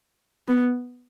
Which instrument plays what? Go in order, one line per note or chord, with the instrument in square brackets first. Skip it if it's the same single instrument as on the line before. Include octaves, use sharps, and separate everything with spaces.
[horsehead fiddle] B3